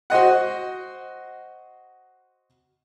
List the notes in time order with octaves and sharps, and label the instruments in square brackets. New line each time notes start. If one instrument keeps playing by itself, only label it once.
[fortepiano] F#4 C5 D#5 F#5